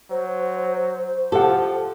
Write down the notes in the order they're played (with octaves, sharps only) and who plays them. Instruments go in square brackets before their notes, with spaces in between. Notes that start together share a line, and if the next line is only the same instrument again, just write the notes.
[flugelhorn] F#3 [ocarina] C5
[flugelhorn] F3 [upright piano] G4 F#5 [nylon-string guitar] A4